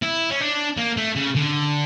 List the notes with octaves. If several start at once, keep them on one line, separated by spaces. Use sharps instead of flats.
E4
C#4
D4
A#3
A3
C#3
D3